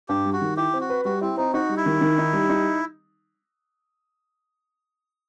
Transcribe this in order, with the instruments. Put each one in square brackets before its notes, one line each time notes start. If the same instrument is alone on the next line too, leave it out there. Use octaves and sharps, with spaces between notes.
[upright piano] G2 [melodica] G4
[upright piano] G3
[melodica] F#4
[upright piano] D#3
[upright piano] E4 [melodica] G4
[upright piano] C4
[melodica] F#4
[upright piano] B4
[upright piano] G3 [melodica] F#4
[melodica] C4 [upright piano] E4
[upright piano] C4 [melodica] D#4
[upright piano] D#4 [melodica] F#4
[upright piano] G3
[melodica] E4
[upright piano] D#3
D#3
D#4
G3
D#4